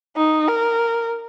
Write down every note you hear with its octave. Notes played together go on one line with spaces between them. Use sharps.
D#4
A#4